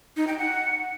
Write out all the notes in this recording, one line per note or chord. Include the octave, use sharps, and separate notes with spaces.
D#4
G5
F#5